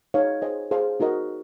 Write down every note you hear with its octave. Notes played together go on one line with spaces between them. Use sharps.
D#4 G#4 C#5 F5
G#4 C5 D#5 G#5
G#4 C5 F5 A5
D#4 F#4 A#4 D#5